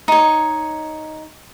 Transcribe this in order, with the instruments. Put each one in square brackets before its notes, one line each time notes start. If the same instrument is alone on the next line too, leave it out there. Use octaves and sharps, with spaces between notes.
[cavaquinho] D#4 C#5